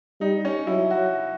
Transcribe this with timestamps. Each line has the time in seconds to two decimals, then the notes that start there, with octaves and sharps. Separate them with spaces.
0.21 G3 D#4
0.45 C#4
0.67 F#3 E4
0.91 F#4